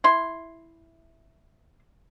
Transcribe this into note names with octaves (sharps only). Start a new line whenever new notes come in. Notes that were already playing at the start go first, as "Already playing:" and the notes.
E4 C6